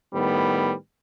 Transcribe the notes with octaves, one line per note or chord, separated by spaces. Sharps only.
A2 D#3 G3 B3